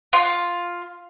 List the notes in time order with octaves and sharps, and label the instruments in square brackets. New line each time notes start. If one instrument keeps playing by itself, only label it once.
[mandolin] F4